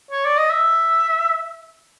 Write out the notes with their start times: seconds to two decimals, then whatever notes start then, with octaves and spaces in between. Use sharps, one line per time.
0.11 C#5
0.25 D5
0.37 D#5
0.51 E5